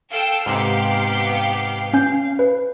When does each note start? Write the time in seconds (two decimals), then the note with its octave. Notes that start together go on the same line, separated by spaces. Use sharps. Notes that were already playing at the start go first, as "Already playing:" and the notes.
0.11 A4 F5 G5 E6
0.46 G#2 C3 B3 G4
1.93 C#4 G#5 G6
2.39 B4